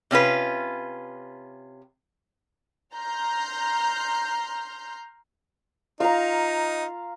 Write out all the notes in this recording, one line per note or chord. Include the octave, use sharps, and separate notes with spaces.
C3 C#4 F4 B4
A#5 C6 F6 G6
D#4 F4 F5 A#5